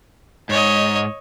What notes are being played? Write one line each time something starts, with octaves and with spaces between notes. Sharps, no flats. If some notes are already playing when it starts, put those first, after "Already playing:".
G#2 C#5 D#5